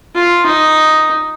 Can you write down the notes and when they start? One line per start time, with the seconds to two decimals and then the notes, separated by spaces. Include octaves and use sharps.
0.15 F4
0.46 D#4